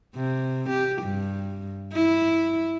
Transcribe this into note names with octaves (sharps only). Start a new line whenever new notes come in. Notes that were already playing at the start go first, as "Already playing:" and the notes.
C3
G4
G2
E4